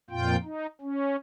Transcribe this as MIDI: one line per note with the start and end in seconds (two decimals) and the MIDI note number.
0.10 0.36 41
0.10 0.36 46
0.10 0.36 65
0.10 0.36 79
0.43 0.66 63
0.81 1.16 61